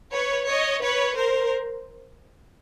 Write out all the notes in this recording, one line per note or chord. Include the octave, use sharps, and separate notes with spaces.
B4 C#5
C#5 D#5
B4 C#5
A#4 C5